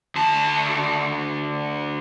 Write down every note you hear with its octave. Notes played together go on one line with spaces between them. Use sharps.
D2 A5